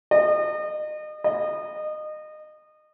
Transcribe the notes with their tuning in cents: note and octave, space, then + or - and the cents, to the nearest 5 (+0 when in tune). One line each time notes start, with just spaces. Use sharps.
D#5 -35
D#5 -25